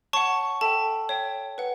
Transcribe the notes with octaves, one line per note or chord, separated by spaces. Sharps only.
C#5 F#5 A5 C#6
A4 E5 G5 A5
C#5 E5 G5
B4 F#5